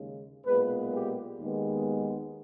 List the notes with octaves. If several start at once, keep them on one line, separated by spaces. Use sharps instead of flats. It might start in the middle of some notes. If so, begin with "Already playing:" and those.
Already playing: D#2 C#3 G#3
B1 A#2 G#3 B3 B4
G4
D#2 D#3 G#3 B3